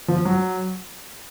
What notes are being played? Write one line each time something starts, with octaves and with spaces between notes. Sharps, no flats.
F3
F#3